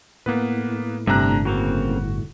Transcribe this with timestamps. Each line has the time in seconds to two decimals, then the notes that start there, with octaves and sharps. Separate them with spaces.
0.26 A2 A#3 B3 B4
1.07 G1 C3 A3 D4 A#5 F#6
1.45 C#3 A#3 C4 F#4